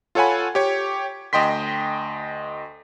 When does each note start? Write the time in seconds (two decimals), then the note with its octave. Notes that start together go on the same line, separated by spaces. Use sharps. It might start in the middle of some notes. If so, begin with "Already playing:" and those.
0.15 F4 A4 C#5 F#5 G#5 B5
0.55 G4 C#5
1.33 D2 D#5 G5 C6 B6